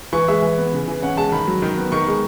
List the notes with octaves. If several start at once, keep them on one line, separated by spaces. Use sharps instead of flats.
E3 C#6
G#3 E5
E3
B3
C#3
E3
C#4 F#5
G#3 A5
D#3 B5
F#3
D#3
B3
D#3 C#6
G#3